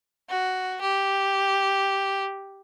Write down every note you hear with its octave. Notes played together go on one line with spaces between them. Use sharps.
F#4
G4